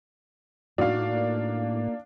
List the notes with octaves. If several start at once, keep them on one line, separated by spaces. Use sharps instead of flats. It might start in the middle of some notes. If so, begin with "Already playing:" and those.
A2 A#3 D4 D#4 F#4 F5